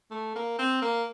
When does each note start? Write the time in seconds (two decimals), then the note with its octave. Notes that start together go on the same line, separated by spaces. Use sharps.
0.11 A3
0.36 A#3
0.59 C4
0.82 A#3